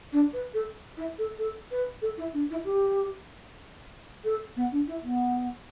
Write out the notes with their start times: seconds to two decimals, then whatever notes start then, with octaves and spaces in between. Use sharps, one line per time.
0.12 D4
0.33 B4
0.53 A4
0.97 E4
1.18 A4
1.38 A4
1.71 B4
2.01 A4
2.17 E4
2.33 D4
2.50 E4
2.65 G4
4.24 A4
4.56 B3
4.71 D4
4.87 E4
5.03 B3